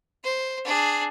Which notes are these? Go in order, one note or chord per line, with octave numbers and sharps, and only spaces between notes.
C5
D4 G#4